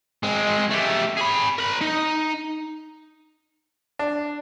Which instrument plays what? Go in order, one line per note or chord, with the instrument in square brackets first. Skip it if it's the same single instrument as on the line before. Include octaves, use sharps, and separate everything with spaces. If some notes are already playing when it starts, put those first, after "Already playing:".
[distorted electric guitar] G#3 C4
A3 G4
G#4 B5
A#4 B5
D#4
[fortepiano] D4